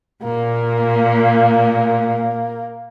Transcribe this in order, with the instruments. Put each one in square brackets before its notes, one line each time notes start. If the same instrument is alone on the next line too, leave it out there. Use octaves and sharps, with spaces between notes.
[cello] A#2 [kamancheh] A#3